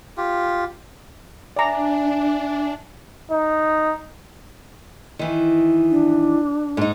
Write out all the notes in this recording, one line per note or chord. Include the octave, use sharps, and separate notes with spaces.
F4 G4
D4 D5 E5 G#5 A#5
D#4
D#3 E3
D4
G#2 D#4